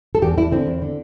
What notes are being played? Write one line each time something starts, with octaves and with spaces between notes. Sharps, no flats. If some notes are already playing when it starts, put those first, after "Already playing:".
A4
E2 G4
E2 E4
D3 C4
E2
D3